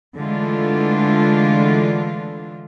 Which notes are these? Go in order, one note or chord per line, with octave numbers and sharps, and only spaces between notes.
D3 E3 G#3 A3 D4 F4